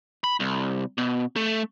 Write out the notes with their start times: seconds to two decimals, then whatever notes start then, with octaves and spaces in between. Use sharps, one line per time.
0.24 B5
0.40 C2
0.98 B2
1.36 A3